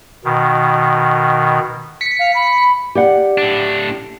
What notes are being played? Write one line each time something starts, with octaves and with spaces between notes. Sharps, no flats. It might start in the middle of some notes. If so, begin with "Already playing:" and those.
B2 D#3
B6 C#7
F5
B5
G4 D5 F#5
A2 D4